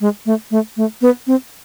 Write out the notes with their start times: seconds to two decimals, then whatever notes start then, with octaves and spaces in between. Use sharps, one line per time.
0.01 G#3
0.26 A3
0.51 A3
0.77 A3
1.02 B3
1.27 C4